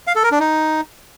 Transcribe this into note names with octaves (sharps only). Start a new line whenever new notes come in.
F5
A4
A#4
D4
D#4